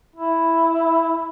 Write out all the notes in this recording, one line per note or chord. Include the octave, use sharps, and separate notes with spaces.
E4